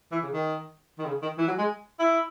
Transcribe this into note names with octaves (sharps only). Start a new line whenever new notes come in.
E3
C#3
D#3
D#3
C#3
D#3
E3
F#3
G#3
E4